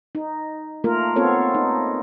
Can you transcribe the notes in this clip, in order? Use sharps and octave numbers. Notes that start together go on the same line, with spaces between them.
D#4
A3 A#3 F4 A#4
B3 C4 F4 A4 C#5
D#4